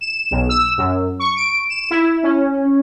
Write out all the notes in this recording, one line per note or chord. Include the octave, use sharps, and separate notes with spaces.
E7
B1
E6
F#2
C#6
D7
E7
E4
C#4